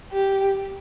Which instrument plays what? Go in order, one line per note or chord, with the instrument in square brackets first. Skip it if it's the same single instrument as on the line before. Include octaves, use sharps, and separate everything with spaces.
[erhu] G4